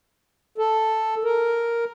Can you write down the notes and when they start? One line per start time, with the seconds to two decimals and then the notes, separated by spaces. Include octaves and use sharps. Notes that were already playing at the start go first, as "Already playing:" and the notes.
0.58 A4
1.24 A#4